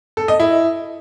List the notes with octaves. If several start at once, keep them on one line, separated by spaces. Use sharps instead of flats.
A4
D#5
E4